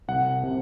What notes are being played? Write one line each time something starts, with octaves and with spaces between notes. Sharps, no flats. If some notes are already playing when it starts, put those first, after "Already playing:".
C2 F#5
C3